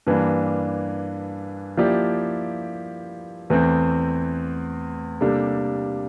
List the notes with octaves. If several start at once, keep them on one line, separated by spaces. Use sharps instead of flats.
G2 E3 A#3 D4
F3 A#3 E4 G4 D5
E2 E3 A3 C4
C3 G3 A#3 D4 A4